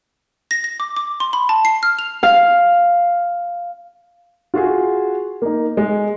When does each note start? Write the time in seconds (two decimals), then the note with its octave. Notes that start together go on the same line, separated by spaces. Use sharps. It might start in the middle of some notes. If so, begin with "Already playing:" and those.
0.51 A#6
0.64 A#6
0.80 D6
0.97 D6
1.20 C6
1.33 B5
1.49 A5
1.65 C7
1.83 F6
1.99 F7
2.23 F5
4.54 F4 F#4 G#4
5.42 A#3 D#4
5.77 G#3